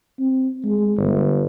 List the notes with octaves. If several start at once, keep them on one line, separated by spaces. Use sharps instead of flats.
C4
G#3
G1